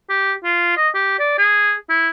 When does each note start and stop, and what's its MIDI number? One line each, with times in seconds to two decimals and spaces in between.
0.10 0.33 67
0.44 0.73 65
0.77 0.89 75
0.94 1.16 67
1.19 1.37 74
1.38 1.74 68
1.89 2.10 64